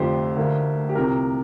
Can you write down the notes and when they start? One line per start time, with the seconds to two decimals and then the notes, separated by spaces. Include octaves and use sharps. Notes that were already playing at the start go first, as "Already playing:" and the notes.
Already playing: F1 F2 D3 F3 G4 C5
0.36 D2 D3 A#3
0.89 G4
0.95 C2 C3 F3 A#3 A#4